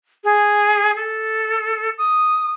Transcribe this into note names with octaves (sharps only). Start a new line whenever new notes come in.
G#4
A4
D#6